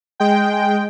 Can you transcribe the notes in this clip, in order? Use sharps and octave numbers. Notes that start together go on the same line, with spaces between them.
G#3 G5